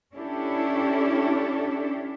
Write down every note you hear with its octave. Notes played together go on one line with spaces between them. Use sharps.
C#4 D4 E4 G4 A4